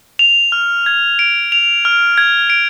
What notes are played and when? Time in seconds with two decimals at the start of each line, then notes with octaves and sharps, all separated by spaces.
0.19 F7
0.52 F6
0.86 G#6
1.19 D7
1.52 F7
1.85 F6
2.18 G#6
2.50 D7